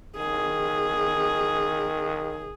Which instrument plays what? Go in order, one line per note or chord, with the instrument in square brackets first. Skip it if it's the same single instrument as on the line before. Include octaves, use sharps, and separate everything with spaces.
[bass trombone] D#3 [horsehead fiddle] G#4